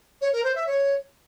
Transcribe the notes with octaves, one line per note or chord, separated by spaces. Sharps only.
C#5
A#4
C5
E5
C#5